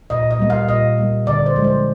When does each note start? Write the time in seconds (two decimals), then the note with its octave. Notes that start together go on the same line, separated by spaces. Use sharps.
0.10 A#2 D#5
0.31 D#5
0.39 G3 A#3
0.50 F5
0.68 A#2 D#5
0.98 G3 A#3
1.26 D3 D5
1.46 C5
1.56 F3 G#3
1.64 C5